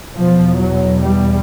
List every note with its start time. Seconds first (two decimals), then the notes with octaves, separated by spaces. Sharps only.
0.15 E2 B2 F3
0.58 F#3
1.02 G3